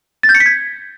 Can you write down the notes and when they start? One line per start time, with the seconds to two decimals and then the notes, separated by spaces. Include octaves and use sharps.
0.23 A6
0.29 G6
0.35 C#7
0.40 B6
0.46 G#6